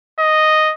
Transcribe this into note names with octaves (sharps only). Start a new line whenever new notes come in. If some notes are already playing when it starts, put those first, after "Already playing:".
D#5